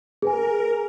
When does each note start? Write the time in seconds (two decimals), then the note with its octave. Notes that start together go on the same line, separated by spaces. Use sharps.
0.22 G#4 A#4 B4 G#5